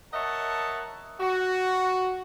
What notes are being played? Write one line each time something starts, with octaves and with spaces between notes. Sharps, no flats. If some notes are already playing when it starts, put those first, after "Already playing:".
A#4 C#5 D#5 E5 F#5 A5
F#4